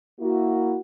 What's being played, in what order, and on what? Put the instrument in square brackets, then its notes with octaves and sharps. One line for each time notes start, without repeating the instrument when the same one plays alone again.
[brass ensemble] A#3 E4 F#4